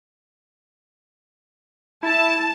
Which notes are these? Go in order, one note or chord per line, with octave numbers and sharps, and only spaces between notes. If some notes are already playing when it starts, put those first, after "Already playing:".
E4 A5